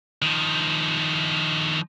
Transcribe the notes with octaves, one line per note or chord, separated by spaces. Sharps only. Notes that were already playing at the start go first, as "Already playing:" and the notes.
D#3 F3